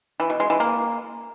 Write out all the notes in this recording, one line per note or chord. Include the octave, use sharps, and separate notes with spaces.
E3
B2
G#3
E3
A#3